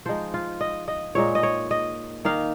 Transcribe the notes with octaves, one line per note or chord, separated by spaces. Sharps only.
F3 G#3 D#4 C5
F4
D#5
D#5
A#2 G#3 D#4 C#5
D#5
C#5
D#5
D#3 A#3 D#4 F5